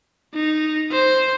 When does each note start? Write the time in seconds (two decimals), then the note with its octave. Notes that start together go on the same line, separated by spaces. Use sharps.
0.34 D#4
0.92 C5